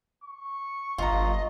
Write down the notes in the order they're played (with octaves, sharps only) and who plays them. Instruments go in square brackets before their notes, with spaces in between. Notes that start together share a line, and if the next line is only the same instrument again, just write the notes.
[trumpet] C#6
[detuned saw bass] G1 [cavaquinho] F4 A#5 [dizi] D#5